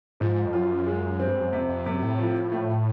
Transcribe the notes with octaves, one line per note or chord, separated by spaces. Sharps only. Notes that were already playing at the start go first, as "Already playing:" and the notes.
G#2 F3
F2
F#2 F4
G#3
C4
G2
F#2
F2 C3
F2
F#2 C3
A2
F3
A3